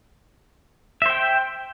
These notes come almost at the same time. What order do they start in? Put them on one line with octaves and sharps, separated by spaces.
E5 C5 G5